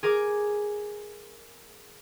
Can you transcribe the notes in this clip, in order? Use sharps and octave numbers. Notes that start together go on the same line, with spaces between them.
G#4 A#4 G#5 D6